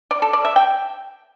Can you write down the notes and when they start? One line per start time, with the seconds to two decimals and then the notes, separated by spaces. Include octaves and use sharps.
0.11 D5
0.22 A4
0.33 D5
0.45 E5
0.56 G5